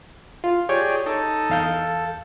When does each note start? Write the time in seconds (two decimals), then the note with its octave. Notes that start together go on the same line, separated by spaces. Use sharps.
0.44 F4
0.69 G4 G#4 C#5 D5
1.06 D#4 A4
1.50 E2 F5 G6
1.74 A4